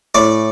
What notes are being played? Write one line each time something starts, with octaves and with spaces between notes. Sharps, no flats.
A2 D5